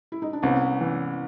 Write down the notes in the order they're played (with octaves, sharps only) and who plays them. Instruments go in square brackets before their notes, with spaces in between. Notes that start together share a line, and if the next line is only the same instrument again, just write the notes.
[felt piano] E4
D#4
D4
[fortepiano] C2 [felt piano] B3 C#4
[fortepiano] E3